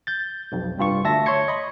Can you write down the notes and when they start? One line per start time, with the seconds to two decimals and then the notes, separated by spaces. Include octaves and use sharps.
0.07 G6 A6
0.52 B1 F2
0.78 C2 G2 F4 C#6
1.04 D2 E5 A5 A#6
1.26 C#5 C6 C#6 G#6 C#7
1.48 D#5 B5